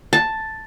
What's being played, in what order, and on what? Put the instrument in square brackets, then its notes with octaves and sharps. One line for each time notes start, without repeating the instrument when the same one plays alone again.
[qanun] A5